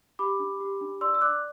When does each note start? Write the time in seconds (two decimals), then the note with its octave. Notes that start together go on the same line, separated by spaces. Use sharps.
0.19 G4 B5 D6
0.40 D4
0.60 G4
0.81 D4
1.01 D5 C6 E6
1.14 E6
1.21 D5 D6 F#6